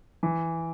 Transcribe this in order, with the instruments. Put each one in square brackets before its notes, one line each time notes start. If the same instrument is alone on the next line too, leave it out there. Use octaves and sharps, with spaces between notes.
[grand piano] E3